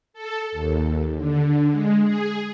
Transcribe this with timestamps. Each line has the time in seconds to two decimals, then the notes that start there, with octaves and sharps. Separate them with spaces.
0.13 A4
0.52 D#2
1.16 D3
1.69 G#3
2.04 G#4